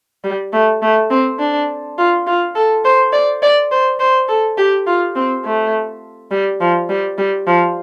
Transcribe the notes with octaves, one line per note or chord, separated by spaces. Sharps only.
G3
A3
A3
C4
D4
F4
F4
A4
C5
D5
D5
C5
C5
A4
G4
F4
C4
A3
G3
F3
G3
G3
F3